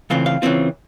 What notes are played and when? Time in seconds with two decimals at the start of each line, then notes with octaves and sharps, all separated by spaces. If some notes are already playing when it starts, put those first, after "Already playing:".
0.10 C#3 E3 A3 C4 F4 F5
0.26 F5
0.42 C#3 E3 A3 C4 F4